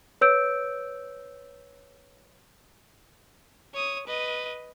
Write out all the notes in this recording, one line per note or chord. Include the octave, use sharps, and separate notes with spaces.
B4 C#5 E6 G6 D7
C#5 D#6
B4 D#5